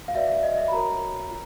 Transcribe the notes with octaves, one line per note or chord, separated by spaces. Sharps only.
F5
F#4 B4 D5 E5
E5
D#5
D#5
E5
B5
F#4 A#4 C#5 A#5
F4